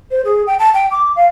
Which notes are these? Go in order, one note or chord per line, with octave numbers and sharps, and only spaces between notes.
C5
G#4
G5
A5
G5
D6
F5